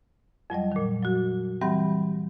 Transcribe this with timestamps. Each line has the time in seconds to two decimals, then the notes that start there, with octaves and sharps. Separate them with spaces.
0.50 F2 F#3 G3 D#5
0.72 A#2 D#3
1.03 F#3 F#4
1.61 E3 G3 C4 G4 F#5 B5